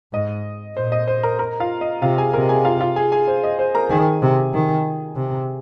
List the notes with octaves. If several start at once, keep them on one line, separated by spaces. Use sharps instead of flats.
G#2 D#5
A#2 C5
D#5
C5
A#4 A#5
A#4 A#5
F4 F5
D#5
C3 F4 F5
G#4 G#5
C3 A#4 A#5
G#4 G#5
F4 F5
F4 F5
G#4 G#5
G#4 G#5
C5
D#5
C5
A#4 A#5
D#3 G#4 G#5
C3
D#3
C3